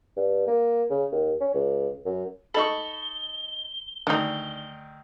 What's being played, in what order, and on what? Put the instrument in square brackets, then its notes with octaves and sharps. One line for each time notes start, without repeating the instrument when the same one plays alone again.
[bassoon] G2
A#3
C#3
D#2
C#4
C#2
F#2
[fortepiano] D#4 A4 [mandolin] B5 C#6 [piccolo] G7
[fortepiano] D2 D#3 [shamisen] D4 D#4 [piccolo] G7